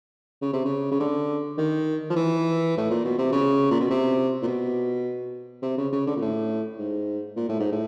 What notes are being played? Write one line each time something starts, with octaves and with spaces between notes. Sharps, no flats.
C#3
C3
C#3
C#3
D3
D#3
F3
E3
A2
A#2
B2
C3
C#3
A#2
B2
C3
A#2
B2
C3
C#3
C#3
D3
A#2
A2
G#2
A#2
A2
G#2
A2